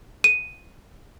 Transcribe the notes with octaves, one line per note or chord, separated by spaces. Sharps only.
D#7